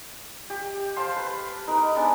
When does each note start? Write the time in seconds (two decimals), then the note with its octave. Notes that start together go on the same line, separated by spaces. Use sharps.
0.50 G4
0.96 C5 F5 A5 C6
1.16 B4
1.67 D#4 A#4 B4
1.96 G#3 B3 D4